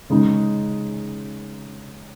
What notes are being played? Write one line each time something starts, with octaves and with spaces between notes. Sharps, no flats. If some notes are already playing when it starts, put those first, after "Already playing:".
C#3 G#3 D#4